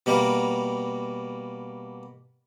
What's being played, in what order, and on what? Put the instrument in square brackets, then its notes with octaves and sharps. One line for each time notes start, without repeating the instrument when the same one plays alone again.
[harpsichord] B2 G3 A#3 A#4